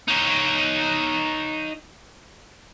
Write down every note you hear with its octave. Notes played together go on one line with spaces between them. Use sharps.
D#4 C#5